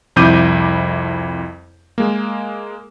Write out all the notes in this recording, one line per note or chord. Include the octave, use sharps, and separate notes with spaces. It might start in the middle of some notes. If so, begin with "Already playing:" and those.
C2 F2 E4 D6 G6 D#7
G#3 A#3